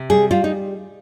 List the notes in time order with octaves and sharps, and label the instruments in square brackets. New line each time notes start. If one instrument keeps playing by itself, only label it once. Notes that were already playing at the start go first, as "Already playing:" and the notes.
Already playing: [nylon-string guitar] C3
G3 G#4
G3 F4
D#4